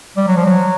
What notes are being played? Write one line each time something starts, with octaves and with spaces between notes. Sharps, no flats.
G3
F#3
F3
F#3